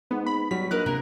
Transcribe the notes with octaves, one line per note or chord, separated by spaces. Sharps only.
G#2 B3
B5
F#3 G3 B6
A#1 A#4 B4 D#5 F#6
C3 A#3 A#4